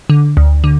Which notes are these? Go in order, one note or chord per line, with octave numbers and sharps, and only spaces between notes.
D3
D2
D3